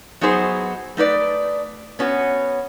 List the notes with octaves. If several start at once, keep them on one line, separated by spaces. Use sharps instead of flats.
F#3 B3 D#4 F#4 G#4 C5
A3 D#4 B4 D5
B3 C#4 F#4